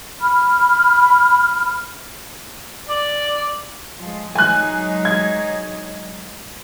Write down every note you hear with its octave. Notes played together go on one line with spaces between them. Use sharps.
B5 F6
D5
F3 G#3
F#3 G#3 D#4 G#5 F#6
G#6